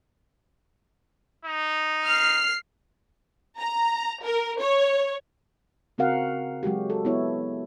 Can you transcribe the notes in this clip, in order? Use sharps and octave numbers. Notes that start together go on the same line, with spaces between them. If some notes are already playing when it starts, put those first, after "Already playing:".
D#4
F6 C7
A#5
A#4
C#5
C#3 C4 F#4 A#4 F5 F#5
F#3 G#3 F#4 G4
A4
B3 E4 C#5